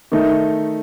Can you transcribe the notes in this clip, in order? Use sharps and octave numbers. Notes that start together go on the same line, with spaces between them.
D#3 A3 D#4